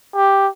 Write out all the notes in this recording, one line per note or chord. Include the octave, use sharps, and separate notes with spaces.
G4